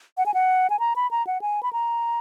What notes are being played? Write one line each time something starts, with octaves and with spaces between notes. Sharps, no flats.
F#5
G#5
F#5
G#5
A#5
B5
A#5
F#5
G#5
B5
A#5